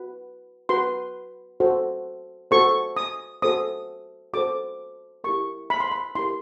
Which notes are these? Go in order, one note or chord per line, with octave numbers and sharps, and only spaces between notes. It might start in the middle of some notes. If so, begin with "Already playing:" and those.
Already playing: F#4 B4
F#4 B4 C6
F#4 A4 C5
F#4 A4 C5 C#6
D#6
F#4 A4 C5 D#6
F#4 A4 C5 D6
E4 G4 A#4 C#6
B5
C6
B5
E4 G4 A#4 C6